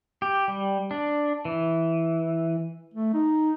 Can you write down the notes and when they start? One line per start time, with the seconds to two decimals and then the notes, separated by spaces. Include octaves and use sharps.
0.22 G4
0.48 G3
0.91 D4
1.45 E3
2.94 A3
3.14 D#4